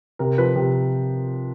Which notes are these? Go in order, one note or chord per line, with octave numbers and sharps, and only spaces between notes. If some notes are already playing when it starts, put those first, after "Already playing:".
C3 A#4
F3 B4
C3